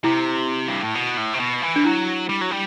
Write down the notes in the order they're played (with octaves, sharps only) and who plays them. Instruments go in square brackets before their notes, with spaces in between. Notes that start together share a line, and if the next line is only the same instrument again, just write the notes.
[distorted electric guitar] C3 [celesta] E4
[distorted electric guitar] G2
A2
B2
A2
C3
B2
E3
[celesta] D4
[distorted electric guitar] F#3 [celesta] E4
[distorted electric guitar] G3
F#3
G3